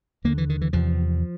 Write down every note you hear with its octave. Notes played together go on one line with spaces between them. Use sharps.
D#2 D3 A#3
E3
D#3
E3
E2 C3 F3